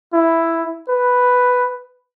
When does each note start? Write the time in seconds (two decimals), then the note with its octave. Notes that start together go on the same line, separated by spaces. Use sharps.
0.13 E4
0.89 B4